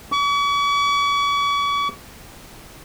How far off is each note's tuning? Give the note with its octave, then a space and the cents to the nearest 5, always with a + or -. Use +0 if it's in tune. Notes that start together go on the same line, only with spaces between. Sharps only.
C#6 +45